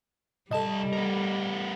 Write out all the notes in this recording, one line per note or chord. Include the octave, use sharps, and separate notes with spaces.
C2 G3 A4 D#5 A5
B3 A#4